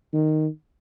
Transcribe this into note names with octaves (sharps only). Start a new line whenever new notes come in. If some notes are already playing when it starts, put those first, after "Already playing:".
D#3